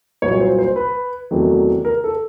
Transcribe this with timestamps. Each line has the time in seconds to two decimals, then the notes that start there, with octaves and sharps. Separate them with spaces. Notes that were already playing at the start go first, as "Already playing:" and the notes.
0.22 C2 A#2 F#3 C#5
0.40 C5
0.58 C5
0.76 B4
1.31 E2 C3 D#3 F#3 A3
1.85 A#4
2.04 A4